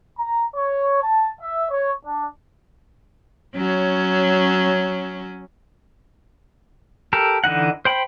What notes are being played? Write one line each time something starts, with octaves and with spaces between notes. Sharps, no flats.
A#5
C#5
A5
E5
C#5
D4
F#3 C#4
G4 A4 A#4
D3 E3 D#4 F#5
C5 G5 B5